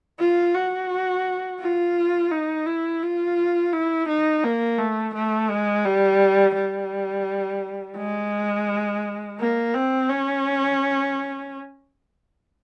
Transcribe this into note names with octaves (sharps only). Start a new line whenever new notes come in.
F4
F#4
F4
D#4
E4
F4
E4
D#4
A#3
A3
A3
G#3
G3
G3
G#3
A#3
C4
C#4